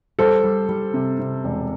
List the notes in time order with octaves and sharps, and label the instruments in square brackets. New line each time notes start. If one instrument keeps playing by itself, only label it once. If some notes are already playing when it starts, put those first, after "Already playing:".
[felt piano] G3 [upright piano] A4 C5
[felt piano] G3
G3
C3
C3
E1